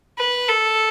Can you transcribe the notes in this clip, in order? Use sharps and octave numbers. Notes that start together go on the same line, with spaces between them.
B4
A4